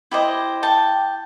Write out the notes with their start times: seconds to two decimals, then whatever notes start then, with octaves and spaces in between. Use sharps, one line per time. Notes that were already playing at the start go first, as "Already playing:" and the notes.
0.11 E4 G4 C5 D#5
0.63 G5 A5